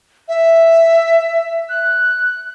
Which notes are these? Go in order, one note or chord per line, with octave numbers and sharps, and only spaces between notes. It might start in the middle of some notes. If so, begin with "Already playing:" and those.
E5
F#6